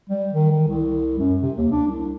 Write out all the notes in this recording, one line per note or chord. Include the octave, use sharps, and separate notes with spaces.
G3
D#3
D#3
C2
F#2
C3
D#2
D4
C2